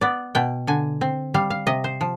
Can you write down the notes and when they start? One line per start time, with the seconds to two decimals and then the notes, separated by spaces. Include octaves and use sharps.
0.01 B3 D5
0.35 B2 G5
0.67 D3 G#5
1.01 C4
1.34 G3 F5
1.50 F5
1.67 C3 D#5
1.84 C5
2.01 F3